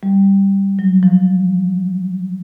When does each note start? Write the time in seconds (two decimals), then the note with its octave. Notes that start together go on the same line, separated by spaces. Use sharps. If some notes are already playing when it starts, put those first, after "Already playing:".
0.03 G3
0.79 F#3
1.03 F3